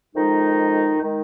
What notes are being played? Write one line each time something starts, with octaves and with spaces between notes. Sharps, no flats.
F2 D#3 G#3 D#4
D#3 G#3 D#4